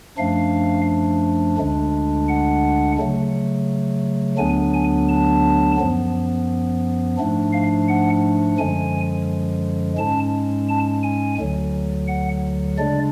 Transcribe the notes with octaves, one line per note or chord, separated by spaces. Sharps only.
F#2 F3 A3 D4 F5
D2 D3 G#3 D4
F#5
C#3 F#3 A3
D2 D3 F#3 B3 D4 G#5
G#5
A5
F#2 F3 B3
G#2 F3 A3 D4
F5
F#5
F#2 D3 F3 G#3 G#5
G#2 G#3 C#4 A5
A5
G#5
D2 D3 F#3
F#5
C#3 G#3 D4 D5